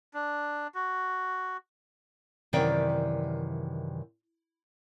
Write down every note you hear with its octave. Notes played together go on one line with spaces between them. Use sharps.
D4
F#4
F#2 C3 D#3 E3 D5 G5